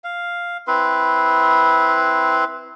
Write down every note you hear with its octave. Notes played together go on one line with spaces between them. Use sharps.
F5
C4 E4 B4 C6